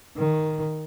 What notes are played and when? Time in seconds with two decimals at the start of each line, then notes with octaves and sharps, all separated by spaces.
0.17 D#3